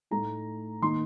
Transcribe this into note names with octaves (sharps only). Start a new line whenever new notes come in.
A2 A3 D#4 A#5
D#3 A#3 D#4 C6